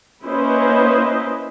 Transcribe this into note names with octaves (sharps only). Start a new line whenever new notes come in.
A#3 C#4 E4 B4 C5 D#5